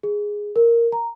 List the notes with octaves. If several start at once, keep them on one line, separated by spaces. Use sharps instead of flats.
G#4
A#4
A#5